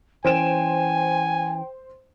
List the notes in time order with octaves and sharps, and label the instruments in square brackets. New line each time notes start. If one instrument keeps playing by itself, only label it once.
[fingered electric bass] E3 C#4 [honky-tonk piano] C5 D7 E7 [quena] G5 [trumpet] G#5